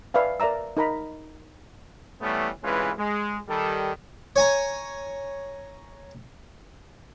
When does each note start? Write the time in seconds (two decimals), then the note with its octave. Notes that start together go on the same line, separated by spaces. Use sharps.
0.14 B4 D5 E5 F5 G#5
0.40 A#4 D5 E5 A#5 E6
0.77 D#4 A#4 A#5 B5
2.21 E3 G3 A3 B3 C#4
2.63 C2 E3 G#3 C#4 F4 B4
2.97 G#3
3.48 D#3 G3 A4
4.36 C#5 G#5 A#5